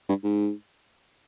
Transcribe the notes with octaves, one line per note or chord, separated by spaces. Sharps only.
G2
G#2